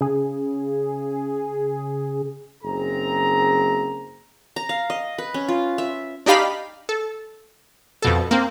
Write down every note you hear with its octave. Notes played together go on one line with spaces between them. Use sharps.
C#3 G#4
F#1 C4 G#4 A#5
A#5
F5
D#5
B4
C#4
F4
E5
D4 D#4 G4 F5 B5
A4
F2 B2 A4
A#3 C4